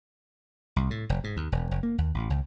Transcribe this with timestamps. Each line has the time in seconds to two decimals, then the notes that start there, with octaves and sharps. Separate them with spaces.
0.76 C2
0.90 A2
1.09 F1
1.24 G#2
1.37 D#2
1.52 E1
1.71 F#1
1.83 A#3
1.98 D#2
2.14 A1
2.30 C#2